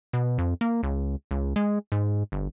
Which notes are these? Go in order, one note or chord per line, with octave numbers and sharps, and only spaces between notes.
B2
F2
A#3
C#2
C#2
G#3
G#2
G1